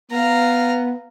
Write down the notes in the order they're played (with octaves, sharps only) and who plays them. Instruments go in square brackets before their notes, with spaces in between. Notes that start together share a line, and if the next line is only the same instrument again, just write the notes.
[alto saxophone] B3 [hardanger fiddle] F5 A#5